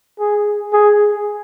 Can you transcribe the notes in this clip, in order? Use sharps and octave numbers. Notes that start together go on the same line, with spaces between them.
G#4
G#4